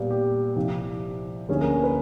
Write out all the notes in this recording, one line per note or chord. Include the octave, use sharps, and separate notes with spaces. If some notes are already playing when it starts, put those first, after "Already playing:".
Already playing: A#2 G3 B3 G4
G4
C2 C3 F3
D2 D3 F3 A#3 C#4 G#4
A#4
A#4
B4